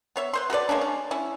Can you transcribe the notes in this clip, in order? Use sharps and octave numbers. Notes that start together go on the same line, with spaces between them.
B3 C#5 E5
B4 C5 C6
F#4 A4 B4 D5
G#3 A#3 C#4 D4
C#4
C#4 E4